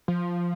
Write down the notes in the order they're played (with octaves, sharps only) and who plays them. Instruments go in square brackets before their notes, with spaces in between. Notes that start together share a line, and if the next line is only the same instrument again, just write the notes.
[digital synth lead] F3